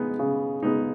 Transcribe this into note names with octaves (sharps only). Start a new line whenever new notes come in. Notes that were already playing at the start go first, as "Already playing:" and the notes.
Already playing: G#3 B3 D#4
C#3
G#3 B3 D#4